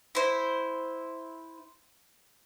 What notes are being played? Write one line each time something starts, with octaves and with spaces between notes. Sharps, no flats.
E4 C5